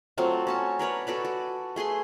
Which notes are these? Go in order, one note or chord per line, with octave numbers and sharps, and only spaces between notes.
F#3 A3 C4 F4
C#4 F#4 A5
A#4 B4 C#5 D5
F#4 A4 B4 D5
F#4
A3 G#4 B4 C6